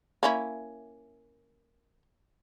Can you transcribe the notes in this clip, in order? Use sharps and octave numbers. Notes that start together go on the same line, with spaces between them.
A#3 C#4 E4